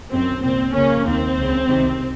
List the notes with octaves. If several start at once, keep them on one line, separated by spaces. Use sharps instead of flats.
F#2 D#3 C4
C2 A#2 C4
F2 C#3 A#3 C#4
D#2 D#3 C4
C#2 C#3
C2 C3 D#3